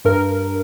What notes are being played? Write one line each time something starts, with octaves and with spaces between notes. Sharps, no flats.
G2 A#4